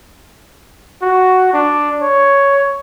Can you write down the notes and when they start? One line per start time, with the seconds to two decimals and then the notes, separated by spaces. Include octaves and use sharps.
1.02 F#4
1.53 D4
2.02 C#5